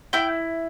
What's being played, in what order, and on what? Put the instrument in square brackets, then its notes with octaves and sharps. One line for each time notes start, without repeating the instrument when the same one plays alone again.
[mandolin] E4 G5